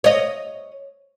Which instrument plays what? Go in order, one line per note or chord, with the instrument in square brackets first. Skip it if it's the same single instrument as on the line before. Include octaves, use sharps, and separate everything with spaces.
[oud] C#5 D#5